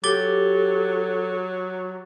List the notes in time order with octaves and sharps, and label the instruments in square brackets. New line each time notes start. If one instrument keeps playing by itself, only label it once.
[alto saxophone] F#3 [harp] G4 [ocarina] A4 [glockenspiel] D6 A6 G7